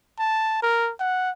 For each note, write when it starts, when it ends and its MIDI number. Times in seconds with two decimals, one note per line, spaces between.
0.19 0.58 81
0.63 0.91 70
1.00 1.30 78